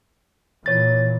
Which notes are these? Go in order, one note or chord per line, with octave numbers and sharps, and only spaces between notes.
A#2 E3 C#5 A6